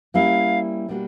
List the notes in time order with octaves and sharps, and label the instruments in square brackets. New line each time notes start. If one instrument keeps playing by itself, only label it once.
[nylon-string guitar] G3 A#3 C#4 E4 [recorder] F5
[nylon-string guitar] B2 G3 A#3 D4 F#4